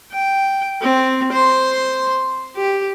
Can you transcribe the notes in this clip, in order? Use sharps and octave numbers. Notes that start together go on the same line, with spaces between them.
G5
C4
C5 C6
G4